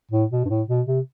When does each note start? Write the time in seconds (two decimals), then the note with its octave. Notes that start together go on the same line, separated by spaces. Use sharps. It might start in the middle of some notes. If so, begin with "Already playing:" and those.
0.11 A2
0.31 B2
0.45 G2
0.49 A2
0.68 B2
0.86 C3